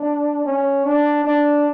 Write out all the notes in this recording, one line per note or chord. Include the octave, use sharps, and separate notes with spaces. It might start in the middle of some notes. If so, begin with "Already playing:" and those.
Already playing: D4
C#4
D4
D4